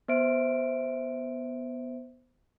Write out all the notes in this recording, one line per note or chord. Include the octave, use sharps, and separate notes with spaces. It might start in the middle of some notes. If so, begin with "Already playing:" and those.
B3 C5 E5 D7